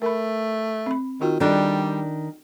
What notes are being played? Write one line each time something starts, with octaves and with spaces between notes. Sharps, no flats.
A3 A#4 B5
C4 B5
D#3 D#4 F4 F#4
D#3 G3 D4 A4